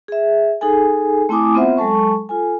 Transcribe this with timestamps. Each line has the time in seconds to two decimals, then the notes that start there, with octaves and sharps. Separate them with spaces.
0.08 G#4 E5
0.61 D#4 G#4 A4 G#5
1.29 A3 C4 E4 G#5 D6 D#6
1.54 B3 C4 F4 C5 E5 F#5
1.78 F#3 G#3 A4 A5 C#6
2.29 F4 A4 G#5